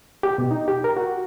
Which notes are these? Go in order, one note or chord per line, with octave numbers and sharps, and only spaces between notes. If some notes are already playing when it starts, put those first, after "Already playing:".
G4
B2
D#4
G4
A#4
F#4